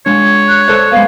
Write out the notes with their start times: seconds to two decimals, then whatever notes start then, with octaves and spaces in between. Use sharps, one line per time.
0.06 G#3 D4 C#5
0.49 F#6
0.68 A4 C5 D5
0.92 G#3 B3 F5